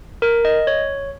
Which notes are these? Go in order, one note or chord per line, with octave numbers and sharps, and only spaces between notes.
A#4
D#5
C#5